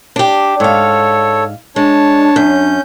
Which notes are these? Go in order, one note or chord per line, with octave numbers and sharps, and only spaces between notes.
D4 G4
G#2 A4 C#5 F5
G#3 D4 C#5 A5
F#2 C#4 G6